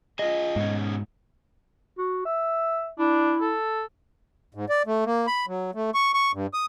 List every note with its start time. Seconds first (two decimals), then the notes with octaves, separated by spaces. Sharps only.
0.19 F4 G#4 D#5
0.56 G#2 B2 C#4
1.98 F#4
2.26 E5
2.99 D4 E4
3.41 A4
4.55 G#2
4.69 D5
4.86 A3
5.05 A#3
5.27 B5
5.47 F#3
5.75 A3
5.94 C#6
6.14 C#6
6.33 G2
6.54 D#6